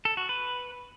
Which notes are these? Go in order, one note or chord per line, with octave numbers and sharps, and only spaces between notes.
A4
F#4
B4